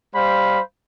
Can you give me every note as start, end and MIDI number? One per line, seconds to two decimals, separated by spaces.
0.15 0.61 55
0.15 0.61 72
0.15 0.61 77
0.15 0.61 83